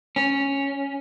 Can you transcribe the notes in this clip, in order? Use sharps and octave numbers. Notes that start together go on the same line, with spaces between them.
C#4